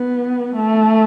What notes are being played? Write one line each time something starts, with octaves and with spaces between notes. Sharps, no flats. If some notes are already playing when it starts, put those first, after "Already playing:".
Already playing: B3
A3